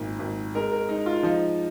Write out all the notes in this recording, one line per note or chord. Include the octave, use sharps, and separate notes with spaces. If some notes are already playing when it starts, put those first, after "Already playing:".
Already playing: G#1 A#2
G#1
G#3 A#4
A#4
G#3 D#4
F4
F3 D#4